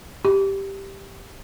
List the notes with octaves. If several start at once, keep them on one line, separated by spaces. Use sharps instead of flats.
G4